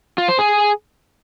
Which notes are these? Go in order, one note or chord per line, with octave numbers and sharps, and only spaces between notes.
F4
C5
G#4